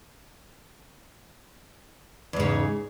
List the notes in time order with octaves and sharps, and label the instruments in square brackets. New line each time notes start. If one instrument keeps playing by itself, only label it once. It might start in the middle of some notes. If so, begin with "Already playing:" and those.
[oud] E2
G#2
C#3